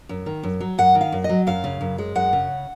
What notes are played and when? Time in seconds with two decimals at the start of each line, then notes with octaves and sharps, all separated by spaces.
0.09 F#2
0.26 D#3
0.43 F#2
0.61 F#3
0.78 F#2 F#5
0.95 D#3
1.01 F5
1.12 F#2
1.24 D#5
1.29 F#3
1.47 F#2 F5
1.64 C#3
1.81 F#2
1.98 G#3
2.15 F#2 F#5
2.33 C#3